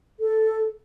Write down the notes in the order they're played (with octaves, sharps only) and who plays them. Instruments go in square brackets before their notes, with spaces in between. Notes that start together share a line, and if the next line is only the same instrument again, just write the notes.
[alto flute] A4